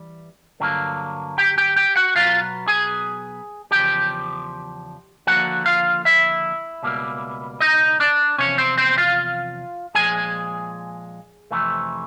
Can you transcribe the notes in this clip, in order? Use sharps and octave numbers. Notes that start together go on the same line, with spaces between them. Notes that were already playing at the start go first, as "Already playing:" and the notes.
Already playing: E3 G3
G2 D3 F#3 A#3
G4 G5
G4 G5
G4 G5
F#4 F#5
B2 F#3 B3 F4 F5
G#4 G#5
E2 C#3 F3 G4 G5
D#2 D3 F3 A#3 F#4 F#5
F4 F5
E4 E5
C#2 B2 G3 A#3
D#4 D#5
D4 D5
E2 C3 F3 C#4 C#5
C4 C5
C4 C5
F4 F5
A#2 F3 G#3 G#4 G#5
F2 C3 E3 A3